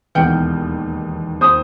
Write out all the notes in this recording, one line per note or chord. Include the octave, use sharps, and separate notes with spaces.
E1 D#2 B2 E3 F#5 G5 F6 G6
D#2 C5 D#6